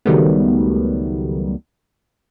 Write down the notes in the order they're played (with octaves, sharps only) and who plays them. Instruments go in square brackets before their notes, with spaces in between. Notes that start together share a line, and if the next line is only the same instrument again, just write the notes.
[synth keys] C#2 D#3 F#3 G3 A3 B3